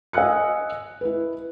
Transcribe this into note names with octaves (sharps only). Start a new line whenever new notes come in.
D#5 G#5 E6 F#6 C#7
E4 B4